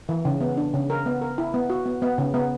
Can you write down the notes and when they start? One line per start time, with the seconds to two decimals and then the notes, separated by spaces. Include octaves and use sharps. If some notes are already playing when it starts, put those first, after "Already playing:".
0.09 E3
0.25 C#3
0.41 B3
0.57 D4
0.74 C#3
0.90 A#4
1.06 B3
1.22 A#4
1.38 E4
1.54 B3
1.70 F#4
1.86 B3
2.02 B3
2.18 C#3
2.34 B3